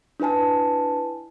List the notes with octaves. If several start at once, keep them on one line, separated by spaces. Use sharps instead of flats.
D4 E4 B4 G#5 A5